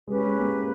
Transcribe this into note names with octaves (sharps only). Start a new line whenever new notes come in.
G#3 C#4 G4 B4
G#3
A#3